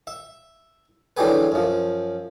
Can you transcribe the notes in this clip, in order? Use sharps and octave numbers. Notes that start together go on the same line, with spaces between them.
E5
D3 E3 F#3 G4 G#4 B4
F#2 F3